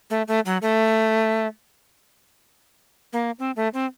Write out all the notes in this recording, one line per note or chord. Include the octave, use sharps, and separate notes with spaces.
A3
A3
F#3
A3
A#3
C4
A3
C4